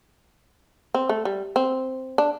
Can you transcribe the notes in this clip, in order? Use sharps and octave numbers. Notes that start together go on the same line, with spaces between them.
C4
A3
G3
C4
D4